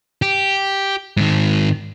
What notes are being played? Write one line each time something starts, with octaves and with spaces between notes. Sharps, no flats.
G4
G#2 D#3